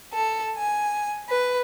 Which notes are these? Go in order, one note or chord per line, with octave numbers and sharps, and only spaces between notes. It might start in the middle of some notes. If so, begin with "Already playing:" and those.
A4
G#5
B4